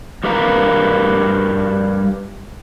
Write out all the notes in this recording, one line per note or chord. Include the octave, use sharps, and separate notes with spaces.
G2 G4 A#4 B4 F5 A#5